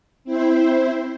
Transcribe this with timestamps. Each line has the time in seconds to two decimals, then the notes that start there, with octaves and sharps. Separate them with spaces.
0.24 C4 E4 C5